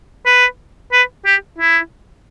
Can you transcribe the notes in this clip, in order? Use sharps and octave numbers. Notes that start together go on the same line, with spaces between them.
B4
B4
G4
E4